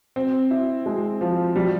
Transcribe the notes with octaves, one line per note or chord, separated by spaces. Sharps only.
C4
E4
G#3
F3
G3